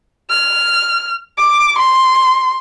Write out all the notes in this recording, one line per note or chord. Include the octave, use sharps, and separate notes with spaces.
F6
D6
C6